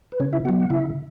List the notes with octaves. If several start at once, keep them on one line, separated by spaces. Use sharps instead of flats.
B4
C#3 C#4 C#5
E4 E5
F#3 B3 F#4 F#5
F#5
C#3 E4 E5